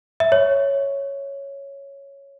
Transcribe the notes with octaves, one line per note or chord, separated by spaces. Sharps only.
E5
C#5